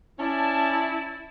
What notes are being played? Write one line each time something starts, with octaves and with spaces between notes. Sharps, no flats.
C#4 E4 D5 A5